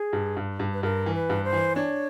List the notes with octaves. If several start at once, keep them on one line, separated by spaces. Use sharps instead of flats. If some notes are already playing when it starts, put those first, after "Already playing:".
Already playing: G#4
G2
G2
G2
B4
G2 A#4
E3
B4
G2
C5
E3
D4 C#5